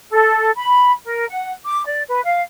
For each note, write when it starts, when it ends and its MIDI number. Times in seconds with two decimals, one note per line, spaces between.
0.11 0.51 69
0.56 0.93 83
1.04 1.25 70
1.29 1.51 78
1.64 1.84 86
1.85 2.02 74
2.07 2.24 71
2.24 2.41 77